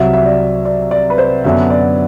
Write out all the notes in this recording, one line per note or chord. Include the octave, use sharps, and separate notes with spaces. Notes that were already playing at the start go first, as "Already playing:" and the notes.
Already playing: C2 C3 F#3 E5
E5
D5
D5
D5
B4
C5
F#2 D3 F#3 B3 D4 E5
D5